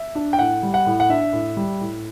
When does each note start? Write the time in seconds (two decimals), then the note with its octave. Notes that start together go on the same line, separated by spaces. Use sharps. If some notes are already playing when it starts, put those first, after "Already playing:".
Already playing: E5
0.15 D4
0.33 G5
0.39 A2 F#5
0.63 G3
0.74 F#5
0.86 A2
1.00 F#5
1.09 D4 E5
1.33 A2
1.57 G3
1.81 A2